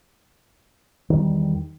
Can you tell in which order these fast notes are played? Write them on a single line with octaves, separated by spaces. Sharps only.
D#3 E2 G3